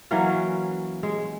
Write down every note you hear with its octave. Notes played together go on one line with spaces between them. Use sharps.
E3 F#3 A#3 C#4
G#3